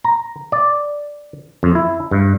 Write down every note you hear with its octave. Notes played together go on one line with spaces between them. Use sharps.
A#5
D5
F2
E4
G2